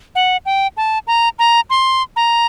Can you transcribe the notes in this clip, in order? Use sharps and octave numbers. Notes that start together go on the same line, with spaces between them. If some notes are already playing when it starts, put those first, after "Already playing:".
F#5
G5
A5
A#5
A#5
C6
A#5